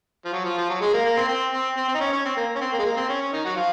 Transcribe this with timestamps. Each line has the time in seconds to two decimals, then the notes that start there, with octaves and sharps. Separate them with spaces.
0.25 F3
0.33 F#3
0.45 F3
0.58 F3
0.69 F#3
0.81 G#3
0.93 A#3
1.05 A#3
1.17 C4
1.29 C4
1.53 C4
1.77 C4
1.88 C4
1.95 D#4
2.01 C#4
2.12 C#4
2.25 C4
2.37 A#3
2.56 C#4
2.61 C4
2.73 A#3
2.79 G#3
2.85 A#3
2.97 C4
3.09 C#4
3.21 C#4
3.33 D#3 D#4
3.45 F#3 F#4
3.56 F3 F4